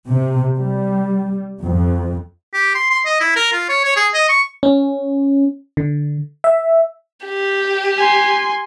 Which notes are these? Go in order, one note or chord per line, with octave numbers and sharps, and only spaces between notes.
C3
G3
F2
G4
C6
C6
D#5
E4
A#4
F4
C#5
C#5
G#4
D#5
C#6
C#4
D3
E5
G4
G#5 C6